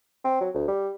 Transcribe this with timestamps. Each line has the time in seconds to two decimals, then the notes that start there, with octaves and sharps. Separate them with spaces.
0.25 C4
0.41 F#3
0.54 D2
0.68 G3